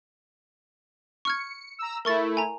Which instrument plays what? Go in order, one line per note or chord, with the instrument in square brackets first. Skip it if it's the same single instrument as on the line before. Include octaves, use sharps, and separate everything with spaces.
[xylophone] C#6 F6 G#6 [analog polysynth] C#7
[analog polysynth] A#5 E6
[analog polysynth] A3 E4 [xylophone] A#4 C#6 A6
[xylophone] G#5 A#5